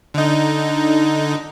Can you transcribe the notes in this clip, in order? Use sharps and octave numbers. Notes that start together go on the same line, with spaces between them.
D3 D#4